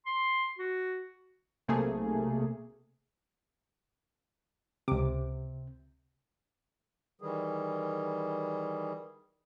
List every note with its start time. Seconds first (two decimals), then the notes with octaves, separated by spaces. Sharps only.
0.06 C6
0.58 F#4
1.68 B1 C3 A3 A#3 G#4
4.88 C#2 C3 D6
7.21 D#3 E3 G3 G#4